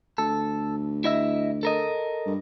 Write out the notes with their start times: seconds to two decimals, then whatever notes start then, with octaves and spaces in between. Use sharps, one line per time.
0.18 D2 A4
1.04 E4 D#5 E5
1.63 A4 A#4 D#5
2.26 G2